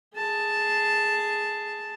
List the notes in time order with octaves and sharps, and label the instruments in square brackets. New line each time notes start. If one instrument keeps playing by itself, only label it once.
[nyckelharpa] G#4 A5